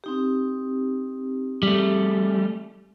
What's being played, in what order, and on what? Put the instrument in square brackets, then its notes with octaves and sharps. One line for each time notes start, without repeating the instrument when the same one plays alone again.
[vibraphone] C4 D#4 G4
[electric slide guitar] G3 A3